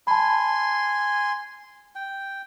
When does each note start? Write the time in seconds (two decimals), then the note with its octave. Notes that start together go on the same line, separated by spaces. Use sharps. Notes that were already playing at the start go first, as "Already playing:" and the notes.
0.07 G#5 A5 B5 C6
1.95 G5